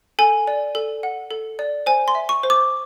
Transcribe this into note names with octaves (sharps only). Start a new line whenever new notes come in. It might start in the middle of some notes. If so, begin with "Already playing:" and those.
A4 G#5
D5
A4
F#5
A4
D5
C5 G#5
C6
E5
C#6
C5
D6